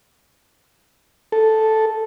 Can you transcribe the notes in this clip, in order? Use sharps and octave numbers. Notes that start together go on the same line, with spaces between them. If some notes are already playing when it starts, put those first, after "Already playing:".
A4